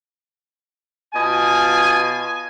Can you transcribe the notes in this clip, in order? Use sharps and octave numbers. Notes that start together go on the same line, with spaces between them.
B2 F4 D#5 G#5